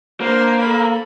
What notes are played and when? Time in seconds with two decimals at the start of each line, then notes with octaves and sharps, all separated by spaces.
0.21 A#3 D4 C5
0.61 A4 B5